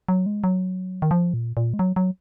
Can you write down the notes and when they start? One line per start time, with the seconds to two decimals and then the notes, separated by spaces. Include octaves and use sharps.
0.08 F#3
0.26 G#3
0.44 F#3
1.02 D#3
1.11 F3
1.34 A#2
1.57 A#2
1.74 G#3
1.79 F#3
1.96 F#3